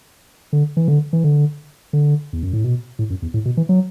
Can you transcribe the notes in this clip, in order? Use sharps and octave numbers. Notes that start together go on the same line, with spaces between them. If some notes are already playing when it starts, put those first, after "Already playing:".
D3
E3
D3
E3
D3
D3
E2
F#2
A2
B2
A2
F#2
E2
A2
B2
E3
F#3